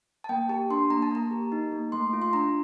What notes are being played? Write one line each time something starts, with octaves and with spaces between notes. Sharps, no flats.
A5
A#3 G5
G4 A5
D4 C6
A#3 A#5
A5
A#3 A#5
G4
D#4
A#3
A3 C6
F4
C6
D4 A#5